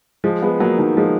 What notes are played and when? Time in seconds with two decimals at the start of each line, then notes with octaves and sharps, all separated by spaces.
0.24 F3 G#3
0.42 G#3 B3
0.60 F#3 A#3
0.79 D#3 F#3
0.97 F3 G#3